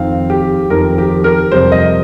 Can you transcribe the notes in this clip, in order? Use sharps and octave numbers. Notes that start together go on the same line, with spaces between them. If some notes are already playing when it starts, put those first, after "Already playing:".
Already playing: F2 D#3 C4 F5
G4
F2 D#3 C4 A#4
G4
A#4
F2 C3 G3 C5
D#5